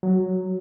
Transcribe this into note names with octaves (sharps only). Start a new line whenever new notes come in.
F#3